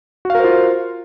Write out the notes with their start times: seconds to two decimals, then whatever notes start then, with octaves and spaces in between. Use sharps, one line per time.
0.25 F#4
0.30 F5
0.35 A#4
0.40 C5
0.44 F4